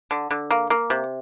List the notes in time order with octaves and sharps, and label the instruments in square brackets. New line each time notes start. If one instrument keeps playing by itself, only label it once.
[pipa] D3
D3
A#3
A#3
C3